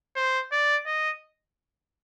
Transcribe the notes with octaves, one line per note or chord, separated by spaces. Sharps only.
C5
D5
D#5